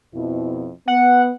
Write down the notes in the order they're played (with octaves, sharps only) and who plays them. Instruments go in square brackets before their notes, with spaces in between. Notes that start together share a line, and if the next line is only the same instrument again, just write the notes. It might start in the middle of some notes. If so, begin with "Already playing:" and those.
[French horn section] F2 B2 E4
[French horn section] B3 [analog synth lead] F#5